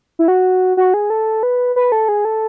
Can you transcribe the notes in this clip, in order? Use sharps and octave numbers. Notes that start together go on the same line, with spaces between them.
E4
F#4
F#4
G#4
A4
B4
B4
A4
G#4
A4